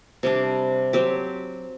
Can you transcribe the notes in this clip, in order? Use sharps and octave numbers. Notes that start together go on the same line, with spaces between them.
C3 G3 D4
F#3 C4 G4